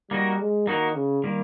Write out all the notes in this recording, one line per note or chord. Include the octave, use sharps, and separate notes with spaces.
G3 A#3 D#4 F#4 A#4
G#3
D#3 A#3 D#4 F#4 A#4
C#3
D#3 G3 A#3